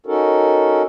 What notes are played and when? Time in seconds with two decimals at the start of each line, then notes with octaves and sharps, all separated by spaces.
0.06 C#4 D#4 F#4 A4 A#4